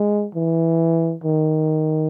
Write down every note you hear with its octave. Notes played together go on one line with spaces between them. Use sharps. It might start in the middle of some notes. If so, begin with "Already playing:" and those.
Already playing: G#3
E3
D#3